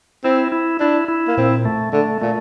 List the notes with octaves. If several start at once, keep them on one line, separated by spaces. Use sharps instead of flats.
C4 E4
E4
D4 E4
E4
A#3
A#2 C4
A3
D3 A3
A#2 A3